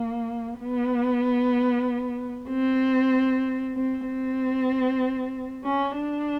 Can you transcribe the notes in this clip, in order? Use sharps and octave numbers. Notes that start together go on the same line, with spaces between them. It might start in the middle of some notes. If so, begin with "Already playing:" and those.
Already playing: A#3
B3
C4
C4
C4
C#4
D4